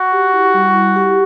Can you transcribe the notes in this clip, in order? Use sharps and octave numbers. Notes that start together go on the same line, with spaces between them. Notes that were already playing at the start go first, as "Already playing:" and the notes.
Already playing: F#4
G4
E4
G3
E4
G4